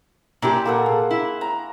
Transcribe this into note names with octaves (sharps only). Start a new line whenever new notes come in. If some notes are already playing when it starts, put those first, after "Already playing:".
A#2 E4 G4 A5 A#5 C6
A#3 A4 F#5
G#4
E4
A#5